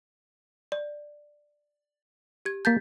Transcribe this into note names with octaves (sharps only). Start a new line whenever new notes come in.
D5
G4 G#6
A#3 A5 G6 A6 B6